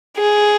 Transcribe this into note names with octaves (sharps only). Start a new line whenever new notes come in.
G#4